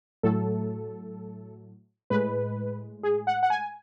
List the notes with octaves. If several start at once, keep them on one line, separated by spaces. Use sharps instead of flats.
A2 F#3 A3 A4
A2 G#3 B4
G#4
F#5
F#5
G#5